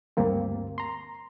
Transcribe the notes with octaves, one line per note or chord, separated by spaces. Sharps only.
D2 G2 A#3 C4
A#5 C6